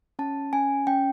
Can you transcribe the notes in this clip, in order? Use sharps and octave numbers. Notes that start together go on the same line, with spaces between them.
C#4 A5
C#4 G#5
C#4 G5